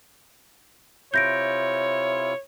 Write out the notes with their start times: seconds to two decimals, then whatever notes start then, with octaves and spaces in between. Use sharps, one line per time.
1.14 C3 E4 F4 C#5 G6 A#6 D7